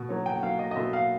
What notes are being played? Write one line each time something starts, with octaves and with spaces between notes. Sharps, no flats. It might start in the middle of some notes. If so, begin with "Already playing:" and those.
Already playing: B2
F#3 C#5
G5
F#5
F#3 F5
D#5
D#5
B2 E5
F5